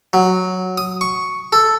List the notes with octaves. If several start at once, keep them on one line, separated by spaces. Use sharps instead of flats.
F#3
D#6
C#6
A4